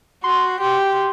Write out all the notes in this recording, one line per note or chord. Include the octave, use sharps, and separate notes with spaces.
F#4 C6
G4